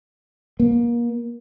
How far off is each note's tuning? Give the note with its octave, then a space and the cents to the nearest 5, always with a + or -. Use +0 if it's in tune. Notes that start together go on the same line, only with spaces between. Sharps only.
A#3 +30